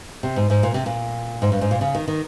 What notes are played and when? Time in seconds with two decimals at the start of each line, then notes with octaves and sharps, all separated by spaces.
0.23 C3
0.36 G#2
0.50 G#2
0.63 A#2
0.74 C3
0.86 A#2
1.42 G#2
1.52 G2
1.61 G#2
1.71 A#2
1.81 C#3
1.95 D#3
2.08 D#3